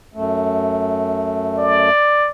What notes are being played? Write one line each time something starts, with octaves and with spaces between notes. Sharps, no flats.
F#2 A3
D5